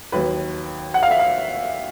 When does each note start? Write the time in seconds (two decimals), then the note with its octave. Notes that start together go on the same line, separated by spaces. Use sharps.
0.12 D#2 D#3 F#3 B4
0.94 F#5
1.03 F5
1.11 E5
1.19 F5